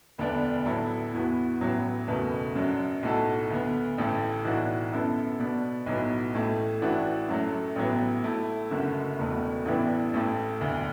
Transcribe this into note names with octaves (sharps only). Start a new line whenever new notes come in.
E1 D2 D3 B3 D4
A2 F#3 B3 E4 A4
E2 E3 B3 F#4
A1 A2 F#3 B3
F#1 E2 B2 A3
F#2 F#3 D4
B1 A2 A3 F#4 A4
D2 D3 B3
A1 A2 A3
B1 A2 E3 D4 F#4
F#2 D3 B3 E4 A4
B2 B3 D4
B1 A2 F#3 B3 F#4
A1 A2 A3
A1 A2 E3 D4 F#4
F#2 F#3 A3
A1 A2 F#3 B3
A2 A3 E4
F#1 F#2 D3 A3 F#4
E1 E2 B2 A3
A1 A2 E3 B3 D4
A1 A2 A3
E1 D2 D3